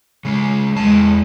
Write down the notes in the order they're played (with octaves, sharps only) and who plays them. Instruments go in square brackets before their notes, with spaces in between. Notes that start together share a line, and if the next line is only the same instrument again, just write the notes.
[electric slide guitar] C#3 G#3
[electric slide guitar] E2 A5 [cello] G#3